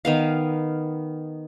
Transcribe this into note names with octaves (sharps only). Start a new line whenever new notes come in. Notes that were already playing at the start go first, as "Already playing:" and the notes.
D#3 B3 F5